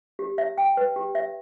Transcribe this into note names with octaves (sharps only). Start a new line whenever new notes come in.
G4
E5
G5
B4
G4
E5